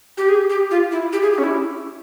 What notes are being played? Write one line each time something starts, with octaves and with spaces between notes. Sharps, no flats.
G4
G#4
G4
F4
E4
G4
G#4
G4
C#4
E4